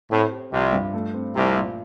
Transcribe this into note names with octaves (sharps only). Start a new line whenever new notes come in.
A2 C4
G4
C2 C3 F3
G2
A3
C4
C2 C3 F3
A#2